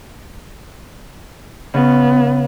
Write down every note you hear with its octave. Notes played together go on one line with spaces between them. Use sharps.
C#3 B3